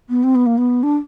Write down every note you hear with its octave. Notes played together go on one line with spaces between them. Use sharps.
B3
C4
B3
A#3
B3
D4